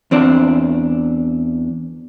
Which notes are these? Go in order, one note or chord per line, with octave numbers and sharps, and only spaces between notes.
E2 C4 D4